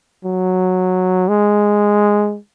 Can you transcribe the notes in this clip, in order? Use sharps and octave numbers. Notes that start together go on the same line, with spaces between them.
F#3
G#3